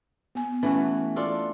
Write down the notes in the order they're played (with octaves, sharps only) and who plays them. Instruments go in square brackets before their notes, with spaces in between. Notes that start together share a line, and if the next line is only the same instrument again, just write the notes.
[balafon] B3 G#5
[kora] E3 A3 F#4 [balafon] C#4
[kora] D4 F4 A4